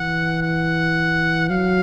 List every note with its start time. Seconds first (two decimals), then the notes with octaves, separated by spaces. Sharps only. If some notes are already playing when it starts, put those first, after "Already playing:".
Already playing: E3 F#5
0.42 F#5
1.50 F#3 F5